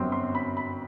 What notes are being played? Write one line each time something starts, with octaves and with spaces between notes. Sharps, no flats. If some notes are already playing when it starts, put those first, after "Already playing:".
Already playing: G1 F#2 F#3 C4
C6
B5
B5